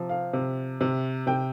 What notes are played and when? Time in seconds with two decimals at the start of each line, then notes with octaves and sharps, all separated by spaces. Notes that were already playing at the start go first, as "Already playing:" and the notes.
Already playing: C3 F3
0.09 F5
0.33 C3
0.81 C3
1.27 C3 G5